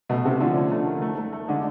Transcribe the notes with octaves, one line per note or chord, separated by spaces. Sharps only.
B2 A3
C3 A3
D3 F3
C#4
A3
D#3
A3
A3
A3
D3 G#3